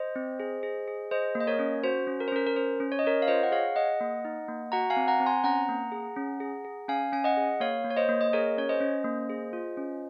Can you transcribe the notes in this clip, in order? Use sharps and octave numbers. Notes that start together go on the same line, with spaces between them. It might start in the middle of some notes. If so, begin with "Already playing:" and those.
Already playing: C5 D#5
C4
G#4
G#4
G#4
G#4 C5 D#5
A#3
D#5
A#4 C#5
C#4
F#4 C5
C#4
A#4
C5
C#4 A#4
A#4
C#4 C5
C#4
C#5
D#5
C#4 A#4 C#5
F5
F4 C5 D#5
F#5
G#4 C#5 F5
G#4 D#5 F#5
A#3
D#4
A#3
F#4 F#5 A#5
F5 G#5
C4
F#5 A#5
C4
G#5 C6
C#4 F#5 A#5
A#3
G#4
C#4
G#4
G#4
C#4 F5 G#5
C#4 G#5
D#5 F#5
G#4
A#3 C#5 F5
A#3
C#5
C5 D#5
A#3
D#5
G#4 A#4 C#5
C#4 C#5
C5 D#5
C#4
A#3
G#4
F4
C#4